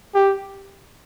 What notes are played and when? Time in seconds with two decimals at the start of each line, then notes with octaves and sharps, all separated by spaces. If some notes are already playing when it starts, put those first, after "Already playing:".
0.15 G4